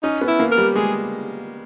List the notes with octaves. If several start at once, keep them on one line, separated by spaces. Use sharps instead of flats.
C#4 D#4
B3
E4
A#3
A#4
G3
G#3 G#4